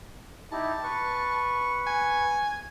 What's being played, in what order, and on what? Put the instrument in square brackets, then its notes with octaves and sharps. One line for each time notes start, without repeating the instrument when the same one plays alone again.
[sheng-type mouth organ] D#4 E4 G4 [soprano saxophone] A5
[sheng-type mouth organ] B4 C#6
[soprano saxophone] G#5